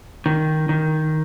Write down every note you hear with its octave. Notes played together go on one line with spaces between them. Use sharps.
D#3
D#3